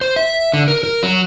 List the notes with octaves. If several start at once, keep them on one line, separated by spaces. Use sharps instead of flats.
C5
E5
D3
A#4
A#4
F#3